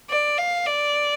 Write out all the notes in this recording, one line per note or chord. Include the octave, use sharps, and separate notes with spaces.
D5
F5
D5